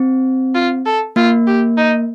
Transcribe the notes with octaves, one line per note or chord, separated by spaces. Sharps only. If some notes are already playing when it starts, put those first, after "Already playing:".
Already playing: C4
F4
A4
A#3 F4
G4
D#4